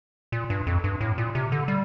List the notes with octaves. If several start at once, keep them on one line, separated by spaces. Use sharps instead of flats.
A#2
G2
F2
G2
A2
A#2
C3
D3
G3